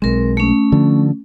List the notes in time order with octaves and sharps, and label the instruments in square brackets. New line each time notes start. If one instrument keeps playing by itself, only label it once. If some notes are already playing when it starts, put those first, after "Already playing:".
[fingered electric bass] B1 G#3 [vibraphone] C4 A#4
[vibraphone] A3 C#4
[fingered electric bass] D3 F3